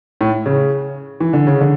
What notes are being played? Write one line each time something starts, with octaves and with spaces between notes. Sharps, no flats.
A2
C#3
E3
D3
C#3
D3